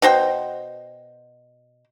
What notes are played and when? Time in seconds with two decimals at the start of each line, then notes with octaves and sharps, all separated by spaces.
0.02 B2 F#4 C5 G5